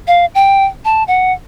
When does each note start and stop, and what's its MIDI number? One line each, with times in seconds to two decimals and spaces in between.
0.07 0.26 77
0.35 0.65 79
0.85 1.03 81
1.08 1.33 78